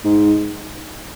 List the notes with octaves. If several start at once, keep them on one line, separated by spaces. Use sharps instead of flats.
G#2